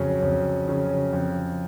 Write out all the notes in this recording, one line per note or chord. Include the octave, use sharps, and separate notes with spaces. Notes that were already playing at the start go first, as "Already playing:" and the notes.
Already playing: F2 C#3 F#3 C#4
F2
C#3 F#3 C#4
F2